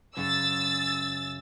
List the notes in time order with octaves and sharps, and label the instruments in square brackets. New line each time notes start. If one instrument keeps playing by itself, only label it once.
[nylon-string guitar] F#2 C#3 [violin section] E6 A6